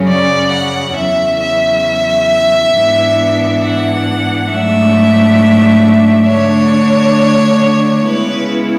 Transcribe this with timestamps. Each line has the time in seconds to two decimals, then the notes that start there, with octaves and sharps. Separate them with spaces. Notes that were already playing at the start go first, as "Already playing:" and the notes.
Already playing: F#2 C#3 F#3 C#4
0.08 D5
0.52 F#5
0.96 E2 C#3 F#3 E5
1.41 E5
2.74 G#2 E3 B3 D4
3.63 F#5
4.51 G#2 F#3 A3 D4 E5
6.29 D3 A3 D4 C#5
8.06 C#3 G#3 B3 E4 B4